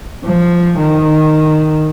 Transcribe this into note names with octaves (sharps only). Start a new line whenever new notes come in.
F3
D#3